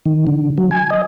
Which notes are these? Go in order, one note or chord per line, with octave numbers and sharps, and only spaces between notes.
D#3
D3
F#3
G#5
D#5